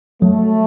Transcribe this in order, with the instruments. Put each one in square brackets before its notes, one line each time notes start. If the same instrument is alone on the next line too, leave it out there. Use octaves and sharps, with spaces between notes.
[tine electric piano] F#3 [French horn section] A3